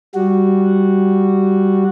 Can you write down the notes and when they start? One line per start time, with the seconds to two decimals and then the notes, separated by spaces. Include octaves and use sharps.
0.15 G3 F#4